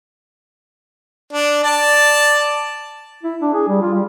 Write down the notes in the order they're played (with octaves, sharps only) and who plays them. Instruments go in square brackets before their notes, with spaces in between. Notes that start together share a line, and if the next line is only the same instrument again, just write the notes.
[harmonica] D4
D5 A5
[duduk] E4
D4
G#4
G3
F4
G3